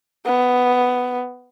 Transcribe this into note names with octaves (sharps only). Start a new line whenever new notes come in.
B3